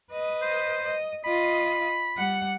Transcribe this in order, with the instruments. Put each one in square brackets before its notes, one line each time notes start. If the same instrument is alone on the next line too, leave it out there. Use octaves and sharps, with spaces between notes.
[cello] B4 D#5
[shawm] C5
[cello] D#5
[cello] F4 D#5 [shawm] B5
[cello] G3 F#5